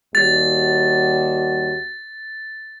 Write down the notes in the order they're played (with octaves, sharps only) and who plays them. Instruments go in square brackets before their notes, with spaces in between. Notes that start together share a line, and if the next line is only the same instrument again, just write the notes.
[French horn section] D#2 G3 F#4 [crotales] A6